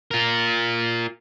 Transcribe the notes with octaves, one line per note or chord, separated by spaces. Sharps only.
F4 A#4